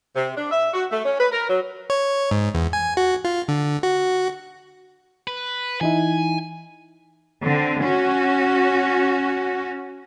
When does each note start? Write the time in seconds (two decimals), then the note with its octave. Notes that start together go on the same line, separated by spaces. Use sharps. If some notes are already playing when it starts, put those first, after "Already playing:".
0.15 C3
0.36 D4
0.51 E5
0.73 F#4
0.91 A3
1.04 C#4
1.19 B4
1.31 A#4
1.48 F#3
1.90 C#5
2.31 G#2
2.55 E2
2.73 G#5
2.97 F#4
3.25 F4
3.48 D3
3.83 F#4
5.27 B4
5.81 E3 D#4 E4 G#5
7.42 D3 C4
7.82 C#4 F#4